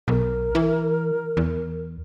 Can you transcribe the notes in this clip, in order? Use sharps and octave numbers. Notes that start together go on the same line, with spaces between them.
B1 A#4
E3
E2